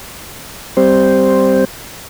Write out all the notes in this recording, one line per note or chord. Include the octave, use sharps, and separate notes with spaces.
G3 C4 C5